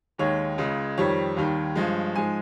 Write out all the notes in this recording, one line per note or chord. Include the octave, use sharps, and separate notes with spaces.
D#2 D#3 G#3 C#5
C#2 C#3 G#3
F2 D#3 G3 C#5
D#2 D#3 G3
G2 F3 G#3
G#2 F3 G#3 G#5